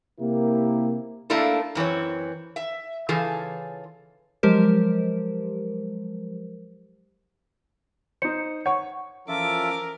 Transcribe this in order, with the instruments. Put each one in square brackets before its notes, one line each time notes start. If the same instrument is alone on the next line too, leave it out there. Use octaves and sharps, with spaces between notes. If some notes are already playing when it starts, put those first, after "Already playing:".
[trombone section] C3 A#3 E4 G4 A#4
[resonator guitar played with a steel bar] A3 A#3 D4 E4 F4 A4
F#2 E3 C4 C#5
E5
C#3 E3 F4 G#4 A4
[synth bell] F3 F#3 G#3 G4 A#4 C5
[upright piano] D#4 C5 [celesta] C#7
[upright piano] C#5 C#6 [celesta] F#5
[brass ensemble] E3 F3 C#4 [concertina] F4 A4 E5 [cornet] A#4 [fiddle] D6